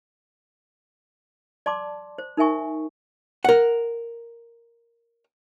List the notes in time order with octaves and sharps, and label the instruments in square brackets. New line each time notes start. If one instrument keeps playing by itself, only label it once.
[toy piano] D5 A5 C6 D6
C5
D#4 A#4 E5 G#5 C#6
[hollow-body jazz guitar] A#4 F#5